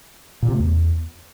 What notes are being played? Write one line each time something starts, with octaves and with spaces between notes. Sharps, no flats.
A#2
C3
A3
E2